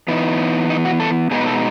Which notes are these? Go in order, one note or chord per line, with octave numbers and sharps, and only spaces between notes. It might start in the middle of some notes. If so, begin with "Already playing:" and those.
E3 B3 D#4
D#4
F#4
A4
B2 G#3 B3 D#4 G#4
B4
A4